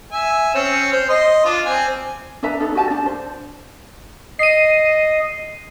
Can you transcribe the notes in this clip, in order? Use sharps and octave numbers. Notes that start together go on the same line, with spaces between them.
E5 G#5
C4 C#4
C5
D#5 C6
D4 F4
C4 G#5
D4 B4 E5 A#5
D4 D#4 A4
F#4 G4 G#5 A5
D4 A5
C5
D#5 C7 D#7